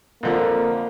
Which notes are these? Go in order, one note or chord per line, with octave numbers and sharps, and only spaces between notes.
F2 D3 F3 A#3